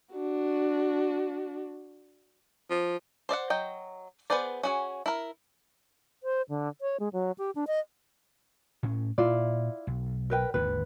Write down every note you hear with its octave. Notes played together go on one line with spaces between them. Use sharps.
D4 F#4
F3
C5 D5 D#5 F#5
F#3 D#5 G5
B3 G#4 B4 C5 D5
C#4 F#4 G#4
E4 A#4
C5
D3
C#5
G#3
F#3
G4
D4
D#5
A2 C#4
A#2 E4 F4 D5
B1
A#4 B4 G5
G#1 D#2 D3 B4